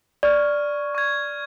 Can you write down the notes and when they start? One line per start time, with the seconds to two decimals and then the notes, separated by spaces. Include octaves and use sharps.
0.23 D5 C#6 F6 G#6
0.95 C#6 F6 G#6